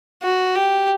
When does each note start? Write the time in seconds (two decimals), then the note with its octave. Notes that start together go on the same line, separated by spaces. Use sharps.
0.23 F#4
0.55 G4